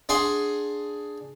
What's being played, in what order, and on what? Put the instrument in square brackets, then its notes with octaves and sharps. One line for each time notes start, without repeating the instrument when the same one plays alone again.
[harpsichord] D4 G#4 F#5 C6